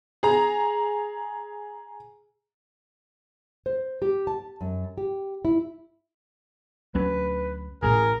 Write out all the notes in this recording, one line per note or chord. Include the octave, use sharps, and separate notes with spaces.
G#4 A#5
C5
G4
A5
F#2
G4
E4
D2 F#3 C#4 B4
D#1 A1 A2 G#4 A#4